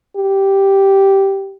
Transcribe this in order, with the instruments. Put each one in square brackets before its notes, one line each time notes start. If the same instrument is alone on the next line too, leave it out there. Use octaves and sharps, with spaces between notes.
[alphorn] G4